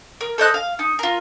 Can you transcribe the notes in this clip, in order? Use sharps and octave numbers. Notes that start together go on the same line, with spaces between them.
A#4
A4 C5 D#5 F#6
F5
D#4
F4 A#4